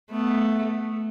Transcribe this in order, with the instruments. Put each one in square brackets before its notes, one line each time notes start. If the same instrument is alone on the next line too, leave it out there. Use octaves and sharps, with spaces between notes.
[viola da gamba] A3 B3